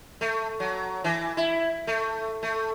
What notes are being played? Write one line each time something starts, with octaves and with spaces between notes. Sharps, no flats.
A3
F#3
E3
E4
A3
A3